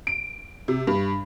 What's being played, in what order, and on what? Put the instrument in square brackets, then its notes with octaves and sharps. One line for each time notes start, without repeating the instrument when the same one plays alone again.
[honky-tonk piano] D7
C3
G2